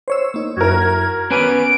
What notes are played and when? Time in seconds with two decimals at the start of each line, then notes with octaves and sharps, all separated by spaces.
0.08 C5 C#5 E6
0.34 A#3 D#4
0.57 F#2 E4 F#4 A#4 G#6
1.31 B3 C#4 B4 G#5 D6 D7